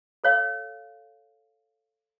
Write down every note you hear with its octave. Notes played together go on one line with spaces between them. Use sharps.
A4 C#5 F5